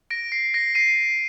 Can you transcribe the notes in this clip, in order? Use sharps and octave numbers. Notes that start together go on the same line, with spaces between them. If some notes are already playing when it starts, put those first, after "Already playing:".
A#6 D7
C7
A#6 D7
C7 D#7